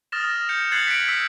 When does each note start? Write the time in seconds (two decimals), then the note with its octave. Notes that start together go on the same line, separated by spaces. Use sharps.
0.12 D#6 F6 A6 A#6 E7
0.49 G6 C#7 F7
0.72 F#6 G#6 A6 C7 C#7 F#7
0.87 B6 D7
1.08 E6 B6 D7